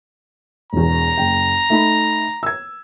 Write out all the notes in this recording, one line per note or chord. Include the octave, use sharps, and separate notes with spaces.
E1 E2 A#5
F#1 G5
A3 D#4 B5
E6 G#6